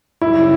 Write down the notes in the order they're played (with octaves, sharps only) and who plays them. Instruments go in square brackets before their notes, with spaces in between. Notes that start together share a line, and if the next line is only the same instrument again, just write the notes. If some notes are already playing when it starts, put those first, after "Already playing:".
[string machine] F#2 C#3 G3 [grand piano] E4